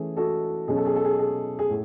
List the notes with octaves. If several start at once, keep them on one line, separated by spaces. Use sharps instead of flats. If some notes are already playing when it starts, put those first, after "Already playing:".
Already playing: E3 A3 C#4 G#4
F#4 A4
B2 F#3 C#4 G#4
A4
G#4
A4
G#4
G#4
G#4
A2